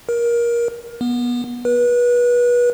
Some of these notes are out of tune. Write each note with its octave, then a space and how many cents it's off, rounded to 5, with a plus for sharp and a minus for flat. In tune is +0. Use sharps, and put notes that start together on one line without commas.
A#4 +20
B3 -25
B4 -30